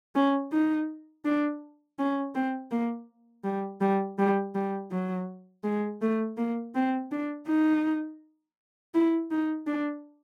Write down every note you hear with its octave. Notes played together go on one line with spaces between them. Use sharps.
C#4
D#4
D4
C#4
C4
A#3
G3
G3
G3
G3
F#3
G#3
A3
A#3
C4
D4
D#4
E4
D#4
D4